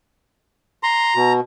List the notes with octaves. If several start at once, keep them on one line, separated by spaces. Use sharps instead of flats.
A#5 C6
B2